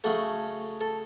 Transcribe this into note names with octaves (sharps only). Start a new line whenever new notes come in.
C#3 F#3 A3 A4
A4